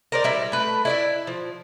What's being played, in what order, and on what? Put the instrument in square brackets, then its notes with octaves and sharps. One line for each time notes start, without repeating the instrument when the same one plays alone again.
[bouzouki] A#4 C5 D5
G3 E4
A3 B4
E4 D5 E5
F3